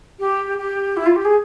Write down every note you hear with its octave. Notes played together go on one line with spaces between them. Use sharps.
G4
G4
E4
F4
G4
G#4